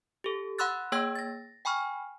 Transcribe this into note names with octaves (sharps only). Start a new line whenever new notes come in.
G4 A4
F#5 B5 C6 E6 F#6 A6
A#3 G#4 C#5 G5 E6 G#6
A6 A#6
G5 G#5 B5 C#6 F6